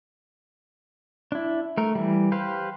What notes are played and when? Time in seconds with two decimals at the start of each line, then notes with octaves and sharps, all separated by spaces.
1.32 D4 E4
1.78 A3 A#4
1.95 E3 G3
2.32 G4 B4 C5 F5